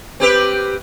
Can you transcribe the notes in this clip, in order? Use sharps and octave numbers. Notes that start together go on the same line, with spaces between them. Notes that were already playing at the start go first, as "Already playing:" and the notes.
C4 G4 B4